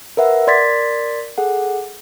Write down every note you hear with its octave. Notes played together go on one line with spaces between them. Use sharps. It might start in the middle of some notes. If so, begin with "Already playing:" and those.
A#4 B4 E5 F#5
A#4 D5 C6 G#6 A6 B6
G#4 A4 F#5